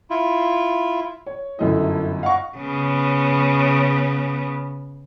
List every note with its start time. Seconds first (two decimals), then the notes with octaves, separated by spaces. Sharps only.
0.10 E4 F4
1.26 C#5
1.59 G1 F#2 E4 A4 D#5
2.23 D#5 F5 F#5 C#6
2.58 C#3 B3